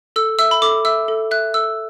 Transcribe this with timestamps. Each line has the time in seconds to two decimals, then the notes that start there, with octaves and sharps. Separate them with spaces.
0.16 A4 E6
0.39 E5 E6
0.51 B5
0.62 A4 D6
0.85 E5 E6
1.08 A4
1.31 E5 F#6
1.54 A4 E6